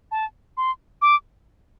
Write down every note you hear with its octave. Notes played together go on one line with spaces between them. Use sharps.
A5
C6
D6